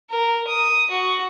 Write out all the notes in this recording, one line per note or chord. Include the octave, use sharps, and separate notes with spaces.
A#4
D#6
F#4